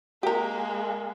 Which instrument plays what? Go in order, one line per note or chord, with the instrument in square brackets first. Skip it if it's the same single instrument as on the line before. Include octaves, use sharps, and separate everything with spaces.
[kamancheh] G#3 A#3 [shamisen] G4 A#4